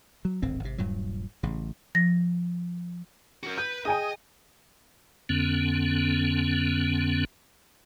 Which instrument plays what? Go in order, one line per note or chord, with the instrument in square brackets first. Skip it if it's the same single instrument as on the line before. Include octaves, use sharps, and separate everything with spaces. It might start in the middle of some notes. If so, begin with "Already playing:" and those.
[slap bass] F#3
D1 G#1 D3 C4
G#1 C3
D#1 G2 A#2 F#3
A1 C#3
[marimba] F3 A#6
[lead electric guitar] F#4 A#4
[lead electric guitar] B4 [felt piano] G6
[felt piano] G#4 [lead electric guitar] D#5 [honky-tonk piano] G5 G#5 D#6
[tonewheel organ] F2 D3 B3 C#4